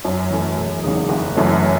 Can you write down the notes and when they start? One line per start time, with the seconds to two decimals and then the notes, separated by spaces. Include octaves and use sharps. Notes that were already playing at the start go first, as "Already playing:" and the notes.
0.05 F#2
0.31 E3 A3 C#4
0.57 E1
0.83 E2 C#3 G#3 D#4
1.09 F#1
1.36 F#2 E3 A3 C#4